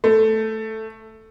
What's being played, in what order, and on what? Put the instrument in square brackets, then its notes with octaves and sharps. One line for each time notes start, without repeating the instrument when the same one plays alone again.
[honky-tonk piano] A3